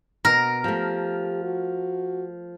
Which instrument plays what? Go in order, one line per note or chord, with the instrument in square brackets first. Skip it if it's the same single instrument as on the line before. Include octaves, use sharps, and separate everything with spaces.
[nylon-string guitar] B2 [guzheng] A#4
[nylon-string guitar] F3 A3 [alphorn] G4
[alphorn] F#4